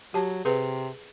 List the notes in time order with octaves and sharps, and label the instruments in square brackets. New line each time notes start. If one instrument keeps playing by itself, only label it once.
[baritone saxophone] F#3 [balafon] G4 A5
[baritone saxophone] C3 [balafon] G#4 B4